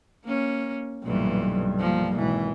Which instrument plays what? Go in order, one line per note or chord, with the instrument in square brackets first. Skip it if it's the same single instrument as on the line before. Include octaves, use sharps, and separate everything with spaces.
[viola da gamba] A#3 C#4
[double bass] B1 G2 [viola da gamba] A#2 E3
[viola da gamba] F3 A#3
[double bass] G#1 E3 [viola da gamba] B2